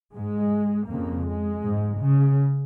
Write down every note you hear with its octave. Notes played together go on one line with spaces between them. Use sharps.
G#2 G#3
F2 C#3 A#3
G#3
G#2
C#3